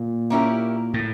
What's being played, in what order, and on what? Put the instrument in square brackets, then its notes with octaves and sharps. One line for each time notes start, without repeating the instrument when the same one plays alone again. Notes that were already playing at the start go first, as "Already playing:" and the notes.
Already playing: [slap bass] A#2
[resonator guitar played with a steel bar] A#3 C#4 E4 G4 A#4
[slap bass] A2